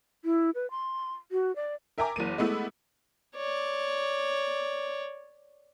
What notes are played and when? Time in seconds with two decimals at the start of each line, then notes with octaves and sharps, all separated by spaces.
0.25 E4
0.55 B4
0.71 C6
1.31 F#4
1.56 D5
1.98 A#4 E5 G5 G#5 A#5 D6
2.16 F#1 E3 A#3 D#7
2.38 G#3 A3 B3 E4
3.36 C#5 D5